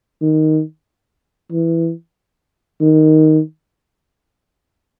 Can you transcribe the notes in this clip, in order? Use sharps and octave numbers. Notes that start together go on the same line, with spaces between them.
D#3
E3
D#3